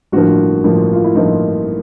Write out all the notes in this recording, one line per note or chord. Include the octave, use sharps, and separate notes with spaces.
A1 G2 D3 F3 A#3 F#4
A1 G2 D3 F3 A#3
F4
E4
A1 G2 D3 F3 A#3 D#4